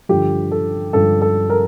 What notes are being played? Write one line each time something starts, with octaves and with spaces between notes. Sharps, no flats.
G2 D3 F3 G4
A4
G2 D3 F3 A4
A4
A#4